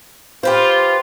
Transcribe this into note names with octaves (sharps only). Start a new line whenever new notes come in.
F4 G4 B4 C5